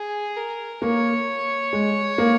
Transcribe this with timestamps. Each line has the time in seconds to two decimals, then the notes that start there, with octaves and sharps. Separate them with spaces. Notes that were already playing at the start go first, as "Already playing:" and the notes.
Already playing: G#4
0.37 A#4
0.82 A#3 C#5
1.73 G#3
2.18 A#3